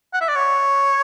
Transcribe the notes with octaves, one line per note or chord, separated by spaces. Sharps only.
F#5
E5
D5
C#5